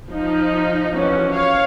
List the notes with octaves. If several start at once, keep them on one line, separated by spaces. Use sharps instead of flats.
F3 D#4
E3 F3 C#4 F#4
C#5 F5